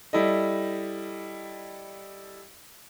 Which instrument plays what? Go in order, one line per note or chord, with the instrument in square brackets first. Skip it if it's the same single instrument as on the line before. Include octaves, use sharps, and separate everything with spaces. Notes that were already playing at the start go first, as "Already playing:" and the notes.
[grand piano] G3 E4 A4 D#5